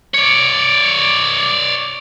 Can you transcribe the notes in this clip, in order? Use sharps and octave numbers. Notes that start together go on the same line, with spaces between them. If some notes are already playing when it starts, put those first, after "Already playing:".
C#5 D5